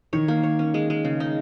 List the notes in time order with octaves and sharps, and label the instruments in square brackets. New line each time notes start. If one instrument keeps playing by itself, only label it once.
[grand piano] D#3 [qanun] C#5
[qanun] A#3
C#5
C#4
G#3
G#3
C#3
D#4